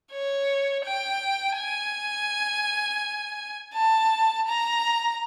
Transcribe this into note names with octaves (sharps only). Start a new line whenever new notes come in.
C#5
G5
G#5
A5
A#5